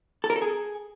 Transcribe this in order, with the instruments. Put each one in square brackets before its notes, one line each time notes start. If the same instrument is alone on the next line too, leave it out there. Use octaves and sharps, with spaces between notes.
[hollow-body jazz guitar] A4
A#4
A4
G#4